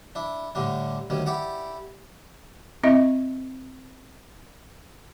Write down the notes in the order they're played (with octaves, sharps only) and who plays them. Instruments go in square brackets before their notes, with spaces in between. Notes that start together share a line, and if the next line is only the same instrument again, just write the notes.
[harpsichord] D4 E4
A2 D3 G3 D4
D2 D#3 G3 C#4
E4 G4 D5 F#5
[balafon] C4 E4 D#5 E5